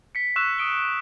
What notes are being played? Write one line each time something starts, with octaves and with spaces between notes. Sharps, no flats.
B6 C#7
C#6 E6 F#6 E7
D#6 D7 G7